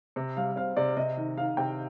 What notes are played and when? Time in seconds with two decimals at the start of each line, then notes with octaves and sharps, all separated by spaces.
0.16 C3
0.37 G3 F5
0.56 C4 F5
0.77 C3 D5
0.97 C3 D#5
1.17 D#3
1.37 D#3 F5
1.57 C3 G5